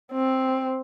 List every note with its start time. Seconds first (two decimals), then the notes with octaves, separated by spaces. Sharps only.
0.12 C4